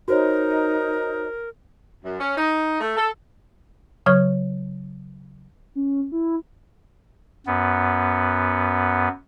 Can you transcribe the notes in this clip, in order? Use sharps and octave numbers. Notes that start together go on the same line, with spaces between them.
D#4 F#4 A#4 C5 C#5
F#2
C#4
D#4
A3
A4
C#3 F#3 C#5 C#6 F6 G#6
C#4
E4
F#2 B3